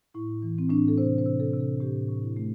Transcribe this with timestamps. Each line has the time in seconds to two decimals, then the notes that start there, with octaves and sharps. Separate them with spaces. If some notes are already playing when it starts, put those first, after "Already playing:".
0.14 A2 E4
0.42 E3
0.58 C4
0.70 A2 D4
0.88 A4
0.98 C3 C5
1.18 C5
1.26 C3
1.40 A4
1.53 C3
1.60 A4
1.80 A2 G4
2.09 A2
2.23 E4
2.37 A3